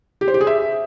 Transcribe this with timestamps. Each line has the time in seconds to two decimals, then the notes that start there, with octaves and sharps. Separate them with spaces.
0.21 G4
0.28 C5
0.34 G4
0.41 G#4
0.47 E5